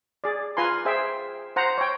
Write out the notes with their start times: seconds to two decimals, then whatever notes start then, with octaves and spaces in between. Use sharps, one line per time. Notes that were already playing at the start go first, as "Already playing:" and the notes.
0.24 G#4 D5
0.57 F4 B4 G#5 A#5 C6
0.85 G#4 C5 E5 G5
1.56 C5 F#5 A#5
1.78 C#5 G5